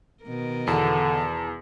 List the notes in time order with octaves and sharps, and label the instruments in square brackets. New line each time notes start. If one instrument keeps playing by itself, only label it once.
[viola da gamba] B2 D#3 A#4
[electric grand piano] E2 [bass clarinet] D3 [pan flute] A5